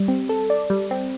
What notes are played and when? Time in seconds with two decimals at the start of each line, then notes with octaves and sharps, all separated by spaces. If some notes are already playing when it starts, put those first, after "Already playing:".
Already playing: G3
0.08 C4
0.29 A4
0.50 D5
0.70 G3
0.91 C4